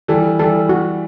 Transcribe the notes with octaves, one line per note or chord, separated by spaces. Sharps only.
E3 G3 A4
E3 G3 A4
F#4